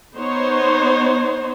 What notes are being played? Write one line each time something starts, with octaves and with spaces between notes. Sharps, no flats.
B3 D#4 C5 C#5